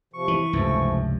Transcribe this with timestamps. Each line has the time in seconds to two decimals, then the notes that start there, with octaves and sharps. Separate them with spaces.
0.13 C3 F3 C#6
0.28 E3
0.53 F1 C#2 G2 E3 F3 A3